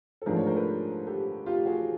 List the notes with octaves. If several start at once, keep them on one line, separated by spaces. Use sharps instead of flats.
A4
G#2 F3 A3 D4 G#4 A#4
C#5
A#4 C5
A4 B4
G4 A4
F4 G4
F#4 G#4